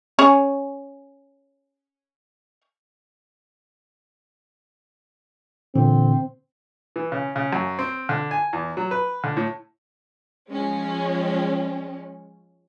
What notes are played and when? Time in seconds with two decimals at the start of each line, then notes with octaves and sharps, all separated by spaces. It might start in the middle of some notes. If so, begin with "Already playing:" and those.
0.19 C#4 G#4 C#5
5.75 A#2 D3 E3 C4
6.96 E3
7.12 C#3
7.36 C#3
7.53 F#2
7.79 C4
8.09 D3
8.31 G#5
8.53 E2
8.77 F#3
8.91 B4
9.24 D3
9.37 A2
10.49 F3 G#3 C#4